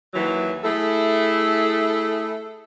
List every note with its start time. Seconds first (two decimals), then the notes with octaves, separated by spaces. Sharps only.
0.14 D#2 E3 F#3
0.64 A3 E4 G#4 A4